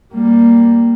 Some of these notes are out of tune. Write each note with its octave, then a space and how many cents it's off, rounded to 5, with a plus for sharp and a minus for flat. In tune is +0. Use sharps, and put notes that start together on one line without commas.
G3 +0 A#3 +0